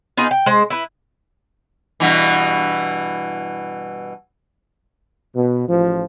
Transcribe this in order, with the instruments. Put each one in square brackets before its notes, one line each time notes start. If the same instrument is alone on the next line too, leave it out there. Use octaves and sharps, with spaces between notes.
[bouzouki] B3 D#4 F4 G#4
G5
G#3 C5
E4 B4
[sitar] G2 B2 E3
[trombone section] B2
A1 F3